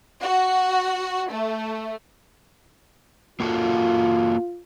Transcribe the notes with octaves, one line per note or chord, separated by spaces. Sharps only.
F#4
A3
A#3 F4 F#4 A4